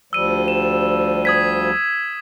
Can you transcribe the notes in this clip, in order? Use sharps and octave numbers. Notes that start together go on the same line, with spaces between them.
D2 F3 G3 E6 D#7
E7
D#6 G#6 B6